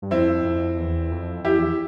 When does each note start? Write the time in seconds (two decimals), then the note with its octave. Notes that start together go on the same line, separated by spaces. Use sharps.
0.02 G2
0.11 F2 C4 E4
0.44 F2
0.78 E2
1.12 F2
1.44 F2 E4 G4
1.56 E2